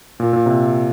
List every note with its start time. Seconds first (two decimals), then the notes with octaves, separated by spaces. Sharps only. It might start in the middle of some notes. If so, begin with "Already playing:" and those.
0.20 A#2
0.33 A#2
0.46 C3